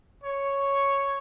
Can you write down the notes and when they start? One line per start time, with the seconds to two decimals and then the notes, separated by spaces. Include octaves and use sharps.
0.24 C#5